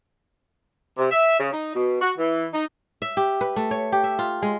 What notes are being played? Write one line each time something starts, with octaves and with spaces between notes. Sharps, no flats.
C3
E5
C#3
D#4
B2
F#4
E3
D#4
E5
G4
B4
A3
C#5
G4
E5
F4
G#3